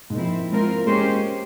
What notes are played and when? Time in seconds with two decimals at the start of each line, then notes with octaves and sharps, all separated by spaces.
0.10 G#2
0.15 A#2 F3 C4 E4
0.50 G#3 C4 F4 A#4
0.86 G#3 A#3 C#4 G4 C5